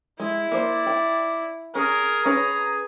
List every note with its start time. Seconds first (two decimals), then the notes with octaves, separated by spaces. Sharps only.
0.20 G#3 E4
0.52 A#3 C5 D5
0.87 G5
1.75 C#4 G#4 A#4
2.25 C#4 B4 A#5